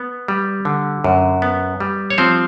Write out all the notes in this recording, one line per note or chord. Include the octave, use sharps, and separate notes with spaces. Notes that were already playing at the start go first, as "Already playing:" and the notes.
Already playing: B3
G3
D3
F#2
B3
G3
C#5
F3 C4 C5